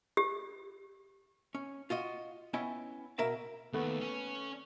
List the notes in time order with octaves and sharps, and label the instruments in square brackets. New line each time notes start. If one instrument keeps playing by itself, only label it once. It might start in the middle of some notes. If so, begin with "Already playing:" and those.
[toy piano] G4
[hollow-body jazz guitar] C#4
F4 F#4 D#5
B3 C#4 E4 C#5 D#5 G5
B2 A#4 E5 F5
[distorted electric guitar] D#2 [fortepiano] A3 B3 B4
[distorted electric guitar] C#4